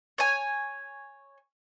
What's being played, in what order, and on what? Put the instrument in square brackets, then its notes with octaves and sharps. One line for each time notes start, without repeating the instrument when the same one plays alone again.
[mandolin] C#5 G#5